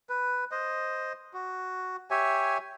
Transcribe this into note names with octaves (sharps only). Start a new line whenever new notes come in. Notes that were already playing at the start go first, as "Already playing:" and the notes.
B4
C5 D#5
F#4
G4 C#5 E5 G#5